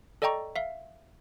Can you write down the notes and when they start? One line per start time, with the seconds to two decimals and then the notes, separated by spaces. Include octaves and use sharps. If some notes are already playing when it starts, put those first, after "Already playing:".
0.22 A4 D5 D#5 G5 A#5 C#6
0.56 E5 F5